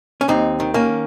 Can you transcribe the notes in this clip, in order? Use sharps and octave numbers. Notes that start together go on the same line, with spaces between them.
C#4
D#2 C4 D#4
D#3
A#3 C#4